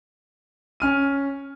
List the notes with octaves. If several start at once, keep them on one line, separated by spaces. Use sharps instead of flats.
C#4 F6 D#7